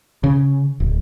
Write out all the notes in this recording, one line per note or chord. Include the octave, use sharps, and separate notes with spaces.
C#3
D1